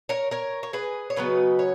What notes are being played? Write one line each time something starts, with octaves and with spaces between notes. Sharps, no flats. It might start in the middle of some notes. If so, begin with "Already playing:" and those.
A#4 C#5
A#4 C#5
C#5
G#4 B4
C#5
C#3 F#3 B3 B4 D#5
C#5